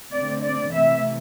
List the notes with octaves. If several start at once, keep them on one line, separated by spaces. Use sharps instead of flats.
D3 A3 C4 D5
D5
C3 E3 A3 E5